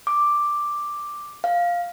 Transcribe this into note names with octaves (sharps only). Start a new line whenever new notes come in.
D6
F5